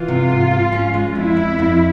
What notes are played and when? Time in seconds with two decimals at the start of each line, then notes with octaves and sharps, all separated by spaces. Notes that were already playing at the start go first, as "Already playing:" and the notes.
Already playing: E3 F4
0.08 C3
0.30 G#2
0.51 G#2
0.72 C#4
0.94 G#3
1.15 F2 E4
1.37 F2
1.59 F2